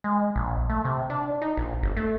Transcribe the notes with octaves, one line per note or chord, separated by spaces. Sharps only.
G#3
A#1
A3
C3
D4
D#4
A#1
G1
A3